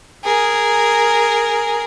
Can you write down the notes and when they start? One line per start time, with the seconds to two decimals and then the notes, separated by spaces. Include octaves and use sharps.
0.24 G#4 A#4